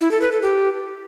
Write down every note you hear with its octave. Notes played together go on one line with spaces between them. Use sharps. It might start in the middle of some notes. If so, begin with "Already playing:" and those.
E4
A4
B4
A4
G4